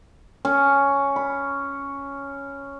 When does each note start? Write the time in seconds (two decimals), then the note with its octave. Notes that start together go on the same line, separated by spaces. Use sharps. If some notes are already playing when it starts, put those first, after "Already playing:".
0.45 C#4
1.16 B5